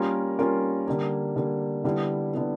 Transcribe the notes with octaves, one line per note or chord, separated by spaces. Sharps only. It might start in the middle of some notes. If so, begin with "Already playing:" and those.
Already playing: G3 A#3 C#4 F4 A#4
G3 A#3 C#4 F4 A#4
D3 G3 A#3
D3 G3 A#3
D3 G3 B3 E4
D3 G3 B3 E4